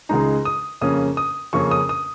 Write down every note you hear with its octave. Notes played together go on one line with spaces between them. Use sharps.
C#2 C#3 G#3 D#4 A#5
D#6
F2 C#3 A#3 C#4 D#6
D#6
F2 C#3 A#3 C#4 C#6
D#6
D#6